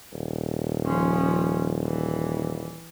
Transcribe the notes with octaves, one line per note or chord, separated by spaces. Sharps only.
D#1
F3 C#4
E3